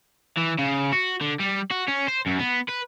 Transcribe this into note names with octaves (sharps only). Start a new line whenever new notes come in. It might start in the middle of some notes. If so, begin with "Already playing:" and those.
E3
C#3
F#4
D3
G3
F#4
C#4
C5
F#2
B3
B4